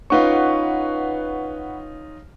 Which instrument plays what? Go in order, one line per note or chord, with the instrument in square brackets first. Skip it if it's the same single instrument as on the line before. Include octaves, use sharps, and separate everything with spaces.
[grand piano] C#4 D#4 F4 [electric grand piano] B4 F#5 C#6